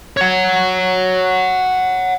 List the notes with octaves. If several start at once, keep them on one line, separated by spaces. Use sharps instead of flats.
C#5 F#5